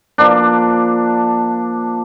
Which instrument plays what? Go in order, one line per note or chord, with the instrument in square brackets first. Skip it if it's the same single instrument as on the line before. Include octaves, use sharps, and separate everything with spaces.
[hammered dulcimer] F3 A#3 D4